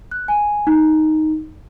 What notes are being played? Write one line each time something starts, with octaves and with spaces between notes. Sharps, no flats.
F#6
G#5
D#4